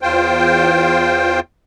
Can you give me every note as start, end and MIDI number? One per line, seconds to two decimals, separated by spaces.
0.02 1.40 40
0.02 1.40 65
0.02 1.40 72
0.02 1.40 79